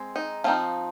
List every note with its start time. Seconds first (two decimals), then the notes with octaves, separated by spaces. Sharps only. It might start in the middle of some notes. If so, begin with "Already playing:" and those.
Already playing: G#3 C4
0.16 D#4
0.44 F3 C4 D#4 F4